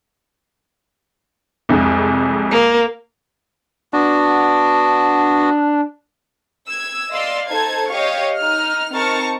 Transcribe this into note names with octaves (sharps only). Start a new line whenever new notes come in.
C2 F2 G#3
A#3
B3 D4 F#4
E6 G#6
D5 D#5 F5 C6 E6
D#4 A4 C5 A5 G#6
G4 C#5 D#5 F5 C#6
D#4 F6
C4 D#4 A#4 A5 C#6 F6